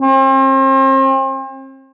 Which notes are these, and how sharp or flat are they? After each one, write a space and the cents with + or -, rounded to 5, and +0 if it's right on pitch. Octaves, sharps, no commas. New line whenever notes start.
C4 +40